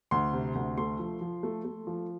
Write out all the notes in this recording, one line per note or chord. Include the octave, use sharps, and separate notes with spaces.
D2 C6
C3
D2
A3 C6
F3
F3
A3
A3
F3